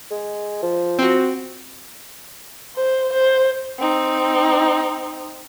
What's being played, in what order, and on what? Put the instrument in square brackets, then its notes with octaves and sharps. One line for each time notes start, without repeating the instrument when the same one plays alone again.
[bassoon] G#3
F3
[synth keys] C4 F#4
[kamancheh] C5
C5
C4 D#4